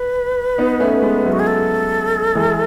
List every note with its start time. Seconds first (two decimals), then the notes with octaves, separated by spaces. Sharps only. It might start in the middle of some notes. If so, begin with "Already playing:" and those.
Already playing: B4
0.58 B3 D#4
0.80 A3 C#4
1.02 G#3 B3
1.24 F#3 A3
1.32 F#4
1.39 G#4
1.47 A4
2.35 E3 G#3